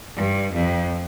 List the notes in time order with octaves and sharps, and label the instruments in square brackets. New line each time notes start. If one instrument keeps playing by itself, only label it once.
[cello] G2
F2